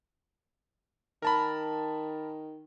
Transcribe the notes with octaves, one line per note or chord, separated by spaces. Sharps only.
D#3 A#4 A5 B5